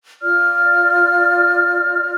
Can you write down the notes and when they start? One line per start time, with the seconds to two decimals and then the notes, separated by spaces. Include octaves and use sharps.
0.22 F4 D5 F6